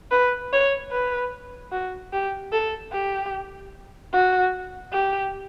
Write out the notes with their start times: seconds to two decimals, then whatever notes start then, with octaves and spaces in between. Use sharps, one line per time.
0.11 B4
0.52 C#5
0.92 B4
1.72 F#4
2.13 G4
2.53 A4
2.93 G4
4.13 F#4
4.93 G4